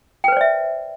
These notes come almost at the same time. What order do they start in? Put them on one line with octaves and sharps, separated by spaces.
G5 B4 C5 D5 E5